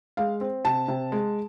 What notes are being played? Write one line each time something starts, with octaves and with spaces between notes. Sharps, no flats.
G#3 F5
C4
C3 A5
C3
G#3